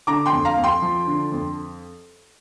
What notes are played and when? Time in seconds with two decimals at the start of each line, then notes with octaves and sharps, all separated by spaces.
0.07 D3 A#5 D6
0.26 G5 C6
0.33 F2
0.45 F5 A#5
0.57 F2
0.64 G5 C6
0.82 F3
1.07 D3
1.32 F2